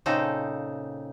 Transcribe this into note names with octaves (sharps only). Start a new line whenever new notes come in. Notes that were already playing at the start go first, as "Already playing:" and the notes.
A#2 C#3 C4 D#4 A4